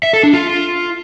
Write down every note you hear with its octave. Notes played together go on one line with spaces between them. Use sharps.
E5
A4
D4
F4